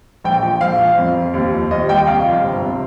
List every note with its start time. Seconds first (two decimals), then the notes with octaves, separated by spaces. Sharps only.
0.24 A#1 G5
0.43 F3
0.61 A#1 F5
0.79 F3
0.97 F2
1.16 F3
1.34 D#2
1.53 F3
1.70 D#2 D#5
1.89 G3 G5
2.07 C2 F5
2.25 F3
2.44 G1
2.63 C3